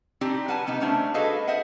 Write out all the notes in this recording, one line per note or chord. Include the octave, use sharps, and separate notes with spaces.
C4 D4 D#4 G4 D5
G3 B4 F#5 G#5 A5
C3 G3 B3 D#4
G3 A3 C#4 D4 C5
F#4 G#4 A4 B4 D#5 F5
G#4 C5 D#5 E5 F#5